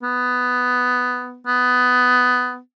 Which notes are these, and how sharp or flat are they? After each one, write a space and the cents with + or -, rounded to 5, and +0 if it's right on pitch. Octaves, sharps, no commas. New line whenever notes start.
B3 +10
B3 +15